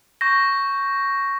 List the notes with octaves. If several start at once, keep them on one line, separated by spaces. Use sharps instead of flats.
C#6 G6 A#6